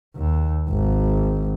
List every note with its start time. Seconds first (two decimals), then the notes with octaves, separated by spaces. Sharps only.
0.16 D#2
0.69 G#1